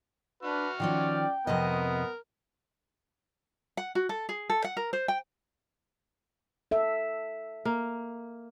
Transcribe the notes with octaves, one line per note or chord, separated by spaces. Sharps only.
D4 F#4 B4 F6
D#3 F3 C#4 D5 G5
F2 C3 B3 A#4 D#5
F#5
F#4
A4
G#4
A4
F#5
A#4
C5
G5
A4 E5
A#3